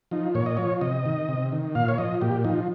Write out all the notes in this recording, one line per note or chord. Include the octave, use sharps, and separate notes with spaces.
F3 D#4
A#2 C#5
D#5
F3 C#5
C3 D#5
D#3
C3
D#3
A#2 F5
C#5
F3 D#5
A#2 G4
F3 D#4